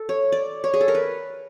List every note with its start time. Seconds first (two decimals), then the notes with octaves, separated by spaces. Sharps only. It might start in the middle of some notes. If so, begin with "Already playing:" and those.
Already playing: A4
0.09 C#5
0.32 D5
0.64 C#5
0.74 G#4
0.81 A4
0.88 A#4
0.95 B4